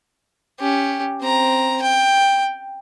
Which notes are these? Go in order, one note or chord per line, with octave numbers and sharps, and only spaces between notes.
C#4 G4
C4 A#5
G5